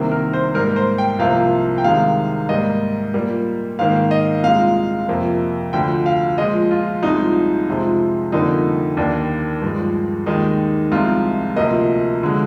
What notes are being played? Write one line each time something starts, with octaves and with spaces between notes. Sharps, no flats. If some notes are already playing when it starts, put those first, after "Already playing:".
Already playing: C2 C3 D#3 A#3
A#4
C5
G#2 G3 A#3 A#4
C5
G5
C2 C3 F3 A#3 F5
G5
C2 C3 D#3 G#3 F5
G#2 G3 A#3 D#5
A#2 G3 A#3
G#2 D#3 A#3 F5
D#5
C2 A#2 G#3 F5
F2 C3 F3 A#3
D2 D3 F3 G5
F5
A#2 F3 G#3 D#5
F4
C2 A#2 F3 G#3 D#4
F2 C3 F3 G#3
F2 D3 G3 A#3 D#4
D#2 D#3 A#3 D4
G2 F3 G#3
D#2 D#3 G#3 D#4
C2 C3 F3 G#3 F4
D2 C3 F3 A#3 D#5
D3 F3 G#3